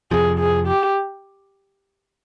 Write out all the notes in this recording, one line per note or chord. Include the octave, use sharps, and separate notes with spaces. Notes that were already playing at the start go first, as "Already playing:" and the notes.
F2 C3 F3 G#4
G#4
G4